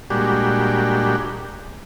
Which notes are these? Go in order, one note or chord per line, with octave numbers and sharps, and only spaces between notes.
A#2 G3 G#3 D4 F#4 G4